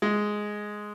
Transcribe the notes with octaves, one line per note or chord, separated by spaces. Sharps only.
G#3